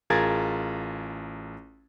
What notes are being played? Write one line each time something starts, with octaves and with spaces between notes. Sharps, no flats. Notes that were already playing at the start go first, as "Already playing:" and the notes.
A1 F4 G#4 A#4 G#6 A6